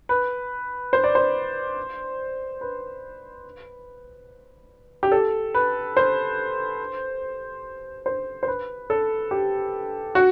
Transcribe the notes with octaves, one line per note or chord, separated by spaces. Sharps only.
B4
C5
D5
C5
B4
G4
A4
B4
C5
C5
C5
B4
A4
G4
F#4